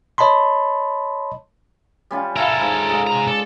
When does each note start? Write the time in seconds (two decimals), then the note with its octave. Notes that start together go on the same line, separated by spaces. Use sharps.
0.18 C#5 D#5 A5 B5 C6
2.11 G3 C#4 F4
2.36 E4 F4 A4 A#4 F5
2.61 G#2
2.89 G#3 F4
3.07 C3 A#5
3.28 A4 D5